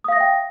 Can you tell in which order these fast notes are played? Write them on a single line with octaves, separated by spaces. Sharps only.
D#6 F5 A#6 E5 G5